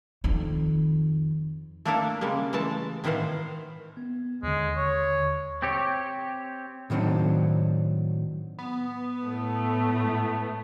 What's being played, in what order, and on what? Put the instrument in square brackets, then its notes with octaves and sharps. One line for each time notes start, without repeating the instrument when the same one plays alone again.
[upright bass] F2 D#3
[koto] A3 A#3 D4 E4 A4 A#4
C#3 G3 G#3 A#3
E3 G#3 A3 A5
A2 D#3 E3 C5 F5 F#5
[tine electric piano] B3
[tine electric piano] D#2 D3 [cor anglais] G#3
[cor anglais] C#5
[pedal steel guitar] C4 G4 C#5
[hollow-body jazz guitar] A2 D#3 F#3 C4 D4
[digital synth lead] B3
[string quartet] A2 A3